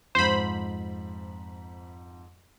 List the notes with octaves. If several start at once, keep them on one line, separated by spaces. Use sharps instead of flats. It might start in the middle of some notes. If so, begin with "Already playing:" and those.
F2 G#2 C5 B5